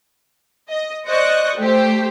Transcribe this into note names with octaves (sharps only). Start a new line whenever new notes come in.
D#5
C5 D5 D#5 C#6 F#6
A3 G4 C5